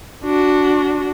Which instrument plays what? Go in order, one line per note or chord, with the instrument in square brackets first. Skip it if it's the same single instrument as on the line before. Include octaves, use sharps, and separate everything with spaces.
[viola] D4 F#4